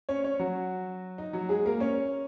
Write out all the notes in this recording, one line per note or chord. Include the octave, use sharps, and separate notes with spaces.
C#4 C#5
C#4 C#5
F#3 F#4
D#4
F#3 F#4
G#3 G#4
A#3 A#4
C#4 C#5